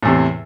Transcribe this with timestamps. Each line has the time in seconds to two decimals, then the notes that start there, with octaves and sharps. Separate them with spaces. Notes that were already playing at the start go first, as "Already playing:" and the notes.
0.03 A2
0.05 E2
0.08 C3